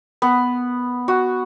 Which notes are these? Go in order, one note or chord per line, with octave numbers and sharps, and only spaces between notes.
B3
F#4